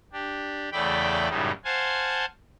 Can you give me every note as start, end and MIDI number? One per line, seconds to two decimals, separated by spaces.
0.13 0.69 62
0.13 0.69 67
0.72 1.29 40
0.72 1.29 49
0.72 1.29 57
0.72 1.29 74
0.72 1.29 79
0.72 1.29 83
1.29 1.51 42
1.29 1.51 45
1.29 1.51 49
1.29 1.51 55
1.29 1.51 63
1.65 2.25 72
1.65 2.25 77
1.65 2.25 78
1.65 2.25 80
1.65 2.25 81
1.65 2.25 84